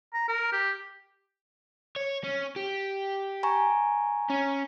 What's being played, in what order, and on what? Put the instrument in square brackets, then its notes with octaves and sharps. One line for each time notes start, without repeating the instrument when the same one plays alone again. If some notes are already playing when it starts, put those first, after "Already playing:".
[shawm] A#5
A#4
G4
[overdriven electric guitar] C#5
C#4
G4
[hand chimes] G#5 A#5 C#6
[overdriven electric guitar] C#4